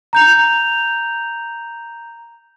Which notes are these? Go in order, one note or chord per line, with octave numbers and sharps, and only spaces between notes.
A#5 G6 F7